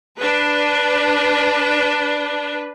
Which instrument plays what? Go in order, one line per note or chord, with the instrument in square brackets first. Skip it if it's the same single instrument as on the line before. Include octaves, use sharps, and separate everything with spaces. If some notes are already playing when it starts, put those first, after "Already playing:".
[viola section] D4 B4